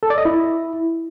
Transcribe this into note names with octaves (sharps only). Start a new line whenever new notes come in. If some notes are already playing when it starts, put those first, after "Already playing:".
A4
D5
D#5
E4